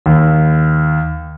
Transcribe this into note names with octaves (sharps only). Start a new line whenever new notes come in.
D#2